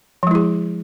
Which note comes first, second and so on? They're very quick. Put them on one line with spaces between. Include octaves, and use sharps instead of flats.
F3 G#3 E4 G#4